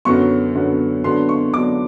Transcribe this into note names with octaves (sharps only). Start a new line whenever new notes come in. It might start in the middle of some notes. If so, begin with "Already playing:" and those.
F#2 D3 F#3 B3 C#6
F#2 D3 F#3 B3
D3 F#3 B3 D4 C6
C#6
D3 F#3 B3 D4 D6